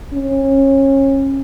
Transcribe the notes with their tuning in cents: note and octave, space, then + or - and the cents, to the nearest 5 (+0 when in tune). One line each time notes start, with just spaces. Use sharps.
C#4 -30